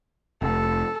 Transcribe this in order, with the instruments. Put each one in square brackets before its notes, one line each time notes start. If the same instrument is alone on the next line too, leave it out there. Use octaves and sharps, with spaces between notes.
[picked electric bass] F1 [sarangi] A4